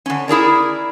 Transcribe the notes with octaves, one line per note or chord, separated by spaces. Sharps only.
D3 C#4
E4 G#4 A#4 D5